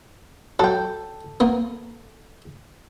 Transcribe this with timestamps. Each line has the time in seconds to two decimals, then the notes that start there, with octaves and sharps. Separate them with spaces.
0.59 F#3 A4 G5
1.40 A#3 B3